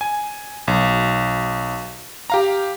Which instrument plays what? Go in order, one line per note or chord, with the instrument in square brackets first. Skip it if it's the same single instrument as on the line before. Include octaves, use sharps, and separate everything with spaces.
[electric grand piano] G#5
B1
G4 F5 A#5